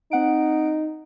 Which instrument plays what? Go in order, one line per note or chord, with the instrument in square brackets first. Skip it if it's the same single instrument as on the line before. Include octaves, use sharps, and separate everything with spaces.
[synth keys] C4 F#5 D7 [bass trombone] D#4